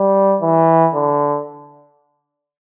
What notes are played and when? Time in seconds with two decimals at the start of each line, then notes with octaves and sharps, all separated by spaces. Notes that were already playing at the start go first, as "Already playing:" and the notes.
Already playing: G3
0.41 E3
0.94 D3